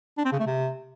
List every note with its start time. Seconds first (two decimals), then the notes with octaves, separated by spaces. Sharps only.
0.18 D4
0.25 C4
0.32 C#3
0.39 A3
0.47 C3